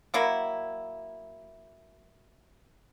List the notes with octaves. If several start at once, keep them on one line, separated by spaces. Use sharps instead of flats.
F#3 A#3 E4